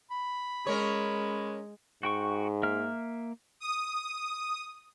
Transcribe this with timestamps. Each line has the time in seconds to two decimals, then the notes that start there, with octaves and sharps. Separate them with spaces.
0.11 B5
0.67 G#3 C#4 A#4 C#5
2.03 G#2 F#4 G5 C#6
2.63 A#3 E5 F6
3.60 D#6